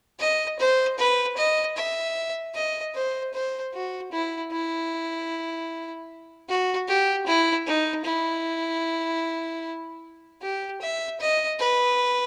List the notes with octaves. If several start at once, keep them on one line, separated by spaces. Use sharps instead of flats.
D#5
C5
B4
D#5
E5
D#5
C5
C5
F#4
E4
E4
F#4
G4
E4
D#4
E4
G4
E5
D#5
B4